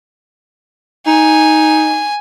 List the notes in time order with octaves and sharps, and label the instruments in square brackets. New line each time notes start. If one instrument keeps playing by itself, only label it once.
[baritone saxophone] D#4 [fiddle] G#5